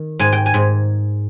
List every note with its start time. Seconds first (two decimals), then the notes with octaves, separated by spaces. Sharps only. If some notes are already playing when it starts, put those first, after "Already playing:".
Already playing: D#3
0.19 G#2 G#5
0.32 G5
0.46 G#5
0.54 G#2